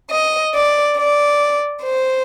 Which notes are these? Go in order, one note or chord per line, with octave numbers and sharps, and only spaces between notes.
D#5
D5
D5
C5